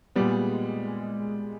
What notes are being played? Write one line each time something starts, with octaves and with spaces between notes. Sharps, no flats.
A#2 G3 G#3 B3
G#3
G#3